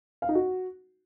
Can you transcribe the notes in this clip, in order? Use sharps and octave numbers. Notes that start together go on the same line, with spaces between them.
F5
D#4
F#4